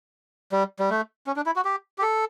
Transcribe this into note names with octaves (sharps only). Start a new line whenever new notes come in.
G3
G3
A3
C#4
D4
E4
F#4
G4
G4
A4